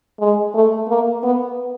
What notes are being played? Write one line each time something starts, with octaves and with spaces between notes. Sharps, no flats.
G#3
A3
A#3
B3